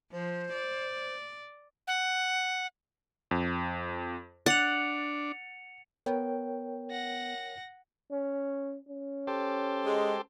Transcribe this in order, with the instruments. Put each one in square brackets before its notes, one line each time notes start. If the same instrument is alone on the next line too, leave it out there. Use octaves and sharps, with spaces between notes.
[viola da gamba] F3 [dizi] C5
[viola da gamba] D5
[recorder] F#5
[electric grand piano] F2
[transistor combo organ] D4 [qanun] F#5 [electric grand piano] A6 [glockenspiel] C#7 F7
[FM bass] B3 [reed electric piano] A#4 C#5 G5
[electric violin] F#5 A#6
[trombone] C#4
C#4
[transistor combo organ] G4 A4 C5
[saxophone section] G#3